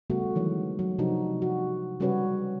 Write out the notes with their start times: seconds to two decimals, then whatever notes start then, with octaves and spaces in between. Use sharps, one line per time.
0.10 C#3 G3 A3 B3 F#4
0.35 D#3 E3 F#3 G#3
0.79 F#3
0.98 C3 F3 D4 D#4 F#4
1.42 F#4
2.00 C#3 G3 C#4 F#4 B4 C#5